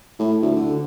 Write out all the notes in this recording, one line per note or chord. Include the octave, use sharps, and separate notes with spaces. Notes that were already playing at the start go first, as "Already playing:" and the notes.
A2
D2
D3